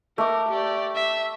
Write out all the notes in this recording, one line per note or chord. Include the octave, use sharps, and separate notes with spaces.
A3 A#4 D6
G4 D5
E5